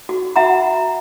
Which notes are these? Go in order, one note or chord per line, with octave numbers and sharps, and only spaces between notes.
F#4
F#4 E5 F#5 A#5 B5